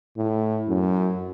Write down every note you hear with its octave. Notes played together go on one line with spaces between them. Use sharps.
A2
F#2